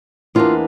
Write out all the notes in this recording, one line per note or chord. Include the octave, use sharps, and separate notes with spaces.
E2 E3 G3 A#3 D4 F4